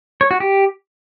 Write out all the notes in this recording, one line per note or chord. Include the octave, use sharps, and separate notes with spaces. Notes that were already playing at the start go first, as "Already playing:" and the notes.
C#5
F#4
G4